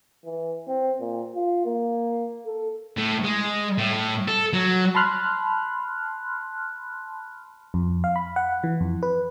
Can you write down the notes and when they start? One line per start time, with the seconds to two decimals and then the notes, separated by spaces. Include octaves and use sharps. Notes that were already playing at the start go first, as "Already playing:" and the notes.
0.25 E3
0.68 C4
1.00 A#2
1.35 F4
1.66 A#3
2.46 A4
2.97 A2
3.25 G#3
3.78 A2
4.28 A4
4.53 F#3
4.95 A5 B5 C6 F6 F#6
7.74 F2
8.04 F5
8.16 B5
8.36 F#5
8.64 E3
8.81 F2
9.03 B4